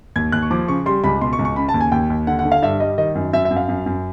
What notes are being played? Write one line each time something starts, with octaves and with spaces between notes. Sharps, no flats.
D#2 G#6
D#2 F#6
C#6
F3 D6
C#3 C#6
G3 C6
C#2 B5
B2 C6
C#6
C#2
C#6
C#3 B5
A5
D#2
G#5
D#2 G5
D#2
D3 F#5
F#5
D3
F5
G2 E5
G3 D#5
D#3 D#5
F#2
F#2 E5
E5
F#2
F5
F#2
F#2